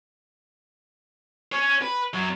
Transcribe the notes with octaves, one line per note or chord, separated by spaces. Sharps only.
C#4 C#5
B4
F#2 F#3